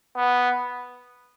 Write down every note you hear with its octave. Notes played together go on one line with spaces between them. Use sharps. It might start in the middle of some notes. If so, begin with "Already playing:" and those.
B3